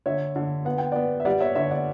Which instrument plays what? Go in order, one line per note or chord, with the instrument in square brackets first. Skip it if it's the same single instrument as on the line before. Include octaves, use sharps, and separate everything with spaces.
[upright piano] D3 C#5 E5
D3
B3 F#5
G5
B3 D5 F#5
E5
G3 D5 F#5
C#5 E5
D3 C#5 E5
D5 F#5